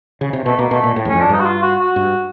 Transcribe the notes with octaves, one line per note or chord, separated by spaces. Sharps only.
C#3
C3
B2 A3
B2 A#3
B2 A3
A#2
A2
E2
C#4
F2
D4
G2 D#4
F#4
F4
F#4
F#4
G2